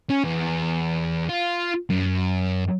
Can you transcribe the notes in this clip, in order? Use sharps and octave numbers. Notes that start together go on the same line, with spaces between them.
C#4
E2
F4
F#2